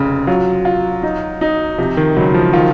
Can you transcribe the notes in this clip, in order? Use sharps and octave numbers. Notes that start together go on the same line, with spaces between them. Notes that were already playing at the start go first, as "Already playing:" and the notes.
Already playing: F1 C#3
F#3 F4
F4
D#4
D#4
C3 F3
D#3
C#2 F#3
F3
D#3 F4